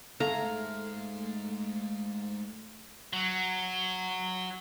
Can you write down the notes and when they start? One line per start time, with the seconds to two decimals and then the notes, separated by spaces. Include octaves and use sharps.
0.20 G#2 G#3 A3 F5 A#5
3.13 F#3